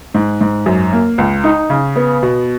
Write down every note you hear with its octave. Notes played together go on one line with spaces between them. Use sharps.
G#2
G#2
F#2
A#3
C#2
D#4
C#3
B3
B2